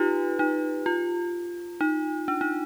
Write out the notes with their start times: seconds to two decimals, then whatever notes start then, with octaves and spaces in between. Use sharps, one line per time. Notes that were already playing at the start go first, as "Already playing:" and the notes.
Already playing: D#4 F4 G4 B4
0.39 D#4
0.86 F4
1.81 D#4
2.28 D4
2.41 D#4